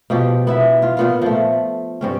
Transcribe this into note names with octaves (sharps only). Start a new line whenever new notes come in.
B2 F3 G4
B3 E4 E5
F4
A#2 B3 F4
F3 A3
G2 C4 C#4